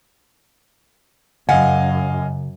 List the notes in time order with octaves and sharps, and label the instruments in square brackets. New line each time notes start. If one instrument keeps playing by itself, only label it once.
[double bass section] F#2 [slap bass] C#3 [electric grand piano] D#5 F5 G#5 [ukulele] F#5